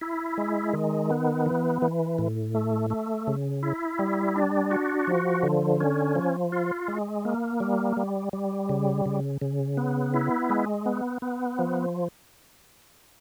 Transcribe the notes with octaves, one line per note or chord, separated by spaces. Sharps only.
E4
G#3
D#3
B3
E3
E3
A2
A3
A3
C#3
E4
G3
D4
F#4
F3
D3
C#4
F3
F4
G#3
A#3
G3
G3
G3
C#3
C#3
C#3
B3
E4
G#3
B3
B3
F3